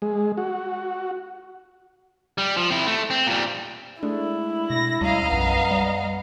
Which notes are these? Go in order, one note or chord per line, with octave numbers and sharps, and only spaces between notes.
G#3
F#4
G3
F3
C4 E4
A3
C4
A#2 G3
G#3 A3 D4 E4
B2 A#6
D2 G3 C#4 D#5 F5 A#5
B1 F#2 B3
G3